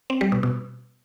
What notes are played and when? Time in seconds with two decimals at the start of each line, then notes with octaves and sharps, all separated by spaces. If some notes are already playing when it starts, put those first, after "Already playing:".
0.10 C4
0.21 G3
0.32 B2
0.43 B2